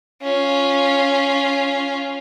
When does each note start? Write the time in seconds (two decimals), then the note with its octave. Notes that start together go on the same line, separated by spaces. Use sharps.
0.21 C#4 F4